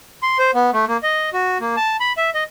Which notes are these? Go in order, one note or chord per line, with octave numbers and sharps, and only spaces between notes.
C6
C5
B3
A3
A#3
D#5
F#4
A#3
A5
B5
E5
D#5